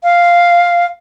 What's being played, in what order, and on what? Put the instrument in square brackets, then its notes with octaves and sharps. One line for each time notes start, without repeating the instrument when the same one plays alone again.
[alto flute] F5